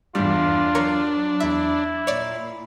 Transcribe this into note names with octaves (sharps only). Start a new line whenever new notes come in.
E2 G2 E3 G3 D4 F4
F#3 A#4 C#5
E2 E4 E5
A#2 C#5 D5